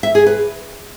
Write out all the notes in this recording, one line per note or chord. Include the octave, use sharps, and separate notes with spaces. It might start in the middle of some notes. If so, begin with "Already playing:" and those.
E5
G#4
B4